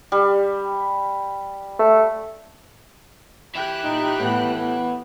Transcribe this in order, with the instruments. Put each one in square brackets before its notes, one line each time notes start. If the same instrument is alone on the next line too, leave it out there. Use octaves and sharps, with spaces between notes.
[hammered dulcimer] G3
[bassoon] A3
[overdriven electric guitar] E3 E4 [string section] G4 G5 F#6
[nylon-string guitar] A#2 [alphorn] D#4
[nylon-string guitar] A2 [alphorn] B3
[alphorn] B3